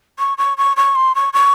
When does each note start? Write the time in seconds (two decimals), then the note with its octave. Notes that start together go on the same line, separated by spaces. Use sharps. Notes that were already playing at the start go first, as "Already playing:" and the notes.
0.19 C#6
0.38 C#6
0.58 C#6
0.77 C#6
0.95 C6
1.15 C#6
1.33 C#6